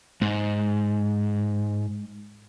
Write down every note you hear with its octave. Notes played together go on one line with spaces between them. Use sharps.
G#2 G#3